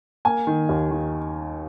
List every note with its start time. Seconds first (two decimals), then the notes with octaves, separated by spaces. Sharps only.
0.25 A#3 G#5
0.47 D#3
0.69 D#2
0.91 D#3